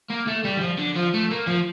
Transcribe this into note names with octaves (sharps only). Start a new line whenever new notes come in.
A#3
A3
G3
E3
F3
D3
F3
A3
A#3
F3